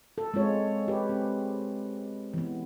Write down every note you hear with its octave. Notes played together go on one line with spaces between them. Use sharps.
A4
G#3 C4 F4 C#5
G4 B4
C4
E3 B3